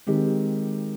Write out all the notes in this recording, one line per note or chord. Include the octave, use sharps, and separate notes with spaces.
D#3 G#3 C4 G4